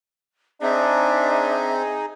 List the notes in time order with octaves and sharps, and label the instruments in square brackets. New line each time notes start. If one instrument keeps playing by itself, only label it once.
[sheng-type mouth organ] C4 [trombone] D4 [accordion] D#4 G#4 [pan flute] E5